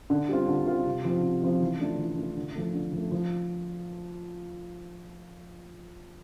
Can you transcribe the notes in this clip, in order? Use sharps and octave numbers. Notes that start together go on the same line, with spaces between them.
D3
G3 C4 F4
D3
G3 C4 F4
C3
F3 C4 F4
C3
F3 C4 F4
E3
A3 D4 F4
E3
A3 D4 F4
D3
F3 A3
D3
F3 A3
F3